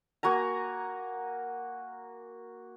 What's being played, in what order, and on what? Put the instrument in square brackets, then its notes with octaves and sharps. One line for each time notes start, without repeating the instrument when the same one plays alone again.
[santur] A#3 F#4 G#5 A#5